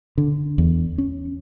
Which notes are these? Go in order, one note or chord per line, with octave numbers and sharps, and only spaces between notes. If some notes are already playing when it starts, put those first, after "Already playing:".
D3
E2
C#4